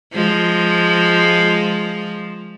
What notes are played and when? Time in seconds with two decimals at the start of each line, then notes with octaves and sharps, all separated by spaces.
0.14 F3 G#3